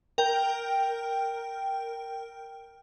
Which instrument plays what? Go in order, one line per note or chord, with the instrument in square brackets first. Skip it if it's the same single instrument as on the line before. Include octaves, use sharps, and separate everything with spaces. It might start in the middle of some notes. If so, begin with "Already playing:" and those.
[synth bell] A#4 G5